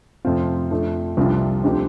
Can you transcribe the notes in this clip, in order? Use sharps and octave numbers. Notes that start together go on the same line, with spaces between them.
F2 C3 A3 C4 F4
F2 F3 A3 D4
C2 C3 F3 D4 F4
D2 D3 F3 C4 G4